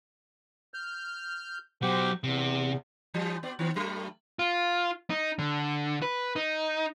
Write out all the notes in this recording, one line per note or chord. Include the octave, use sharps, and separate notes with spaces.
F6 G6
B2 F#3 G4 C5 F#5
E2 C3
E3 G3
B3 D5
D#3 B3
G2 F#3 A3
F4
D#4
D3
B4
D#4